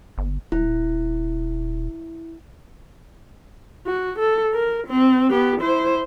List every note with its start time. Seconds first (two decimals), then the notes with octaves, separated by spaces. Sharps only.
0.18 G1
0.52 D#1 E4
3.87 F#4
4.19 A4
4.54 A#4
4.87 C4
5.30 B3 G4
5.61 E4 C5